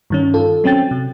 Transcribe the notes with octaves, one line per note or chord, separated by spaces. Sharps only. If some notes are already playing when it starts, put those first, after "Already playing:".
G2 D#3 C#4
F4 A4
F#3 C4 C#4 G5 A6
C3